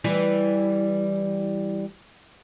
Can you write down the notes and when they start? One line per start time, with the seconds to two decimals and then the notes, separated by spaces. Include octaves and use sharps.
0.04 E3 G3